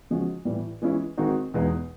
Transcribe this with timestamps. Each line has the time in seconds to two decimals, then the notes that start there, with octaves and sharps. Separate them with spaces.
0.10 C#3 F3 G#3 C#4 F#4
0.45 A2 E3 G3
0.82 E3 G#3 C#4 E4
1.17 D#3 G#3 C4 D#4 F#4
1.54 E2 B2 G#3 B3 D#4